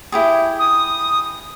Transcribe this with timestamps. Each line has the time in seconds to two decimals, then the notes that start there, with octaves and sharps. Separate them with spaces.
0.12 E4 G4 G#4
0.59 D#6